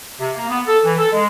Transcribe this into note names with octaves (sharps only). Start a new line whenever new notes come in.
C3
A#3
B3
A4
E3
A4
G#3